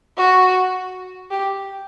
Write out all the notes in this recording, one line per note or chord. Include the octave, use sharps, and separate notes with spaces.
F#4
G4